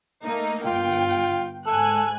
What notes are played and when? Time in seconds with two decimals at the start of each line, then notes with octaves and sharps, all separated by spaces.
0.24 A3 A#3 D#4
0.66 G1 F4 G5
1.66 G#2 A4 G#5 F#6